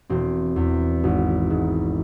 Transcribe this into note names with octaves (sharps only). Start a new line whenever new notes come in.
E1 C4
E2
G#1
G#2